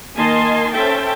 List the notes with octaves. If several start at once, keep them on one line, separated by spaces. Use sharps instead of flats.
D#3 A#3 D#5 G#5 A5 C6
C#4 A4 C5 E5 G5 A5